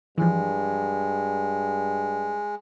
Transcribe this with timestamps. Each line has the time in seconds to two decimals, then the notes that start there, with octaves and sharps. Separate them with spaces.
0.18 G2 E3 F3 G#3